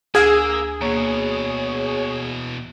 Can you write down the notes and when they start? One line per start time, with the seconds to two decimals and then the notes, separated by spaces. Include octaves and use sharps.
0.15 D2 A#3 G#4 E6 G#6
0.81 E2 B2 A#3 C#5